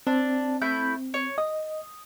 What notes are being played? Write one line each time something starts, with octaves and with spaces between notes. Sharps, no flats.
C4 D4
A3 E4 G6
C#5
D#5 D#6